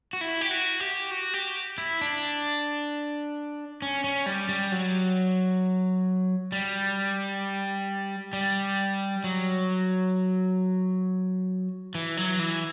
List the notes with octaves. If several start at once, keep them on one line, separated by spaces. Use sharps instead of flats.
F#4
E4
G4
F#4
G4
F#4
G4
E4
D4
C#4
C#4
G3
G3
F#3
G3
G3
F#3
E3
F#3
E3